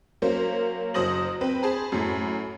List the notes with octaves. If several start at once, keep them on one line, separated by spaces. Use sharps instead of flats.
F#3 A#3 C#4 C5
F#1 F#3 C5 D#6 A#6 F#7
C4 B4
G#4 C5 A5 B5
F#2 A2